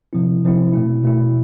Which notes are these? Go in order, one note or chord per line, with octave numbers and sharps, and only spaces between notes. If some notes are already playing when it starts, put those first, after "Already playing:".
C3 F3 C4 E4
C3 F3 C4 E4
B2 A3 E4
B2 A3 E4